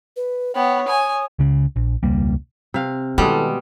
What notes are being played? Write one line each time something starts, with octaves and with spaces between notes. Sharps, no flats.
B4
B3 C#5 G5
G#5 D#6
C#2 C#3
A#1
E1 C#2 G3 A#3
C3 F5
B2 D#3 E3 G3 G#3 A4